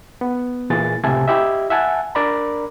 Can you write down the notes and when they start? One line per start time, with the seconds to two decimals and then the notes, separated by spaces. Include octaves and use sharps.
0.21 B3
0.70 A#2 E3 G#4 A6
1.04 C#2 A2 C3 E5 G#5 A5
1.28 E4 G4 D#5 E5
1.70 E5 F#5 G#5 A5
2.15 D4 A#4 D5 A#5 B5